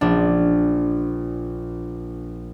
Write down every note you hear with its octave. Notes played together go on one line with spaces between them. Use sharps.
A#1 D4